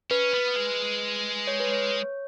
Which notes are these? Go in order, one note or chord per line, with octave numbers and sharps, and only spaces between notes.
C#4 B4
B3
G#3
C#5
B4
C#5